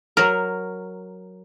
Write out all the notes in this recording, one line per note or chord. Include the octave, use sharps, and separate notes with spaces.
F#3 A#4